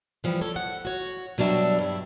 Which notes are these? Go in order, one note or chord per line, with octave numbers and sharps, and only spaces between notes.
E3 F3 G3
A4 C#5
F#5
F#4 C#5
B2 F#3 G3 D4 E5
G2 E4